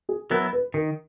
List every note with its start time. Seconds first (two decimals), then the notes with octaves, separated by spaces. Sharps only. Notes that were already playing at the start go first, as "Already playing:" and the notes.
0.09 G#4
0.30 F#3 B3 E4 A#4
0.53 B4
0.74 D#3 A#4